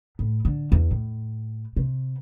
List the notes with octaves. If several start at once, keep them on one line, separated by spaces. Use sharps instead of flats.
A2
D3
E2
A2
C3